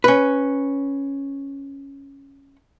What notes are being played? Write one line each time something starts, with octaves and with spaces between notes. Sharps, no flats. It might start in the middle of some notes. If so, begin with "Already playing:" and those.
C#4 B4